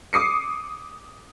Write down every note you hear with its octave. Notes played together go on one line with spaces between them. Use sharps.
D6 D#6 C7 C#7